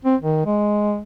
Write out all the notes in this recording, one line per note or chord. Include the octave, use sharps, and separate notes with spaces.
C4
D#3
G#3